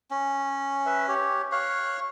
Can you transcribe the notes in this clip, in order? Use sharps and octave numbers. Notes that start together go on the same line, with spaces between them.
C#4
B4 E5
G4 C#5
C#5 F5 F#6